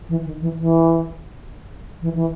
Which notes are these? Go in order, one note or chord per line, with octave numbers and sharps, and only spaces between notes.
E3
D#3
E3
E3
E3
E3